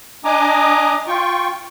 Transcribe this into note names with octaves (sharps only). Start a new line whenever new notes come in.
D4 D#5 G#5 A#5 D6 D#6
F4 G5 C#6